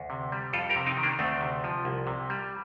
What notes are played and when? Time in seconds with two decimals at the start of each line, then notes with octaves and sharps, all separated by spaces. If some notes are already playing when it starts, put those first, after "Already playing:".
Already playing: D2
0.10 C3
0.32 G3
0.53 F2 F4 A4
0.69 G4 A#4
0.76 C3
0.86 C4 D#4
0.97 D#3
1.03 A#3 D4
1.19 D2 A3 C4
1.41 C3
1.64 F3
1.85 C2
2.07 C3
2.30 G3